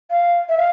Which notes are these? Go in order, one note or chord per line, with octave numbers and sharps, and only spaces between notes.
F5
E5
F5